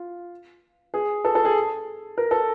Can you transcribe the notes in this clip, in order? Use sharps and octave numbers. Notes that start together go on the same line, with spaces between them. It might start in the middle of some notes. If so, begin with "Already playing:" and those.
Already playing: F4
G#4
A4
A4
G#4
A#4
A4